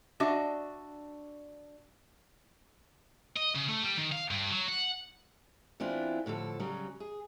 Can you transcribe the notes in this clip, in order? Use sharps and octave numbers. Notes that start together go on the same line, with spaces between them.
D4 F#4 D#5 E5
D#5
C#3
A3
G3
D#3
F5
G2
F#3
F#5
E3 C4 D4 E4 F4
A2 D3 F3 A4
C#3 F#3 G3 C#4
G#4